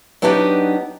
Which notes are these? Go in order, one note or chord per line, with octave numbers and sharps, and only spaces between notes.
F#3 B3 D4 D#4 G4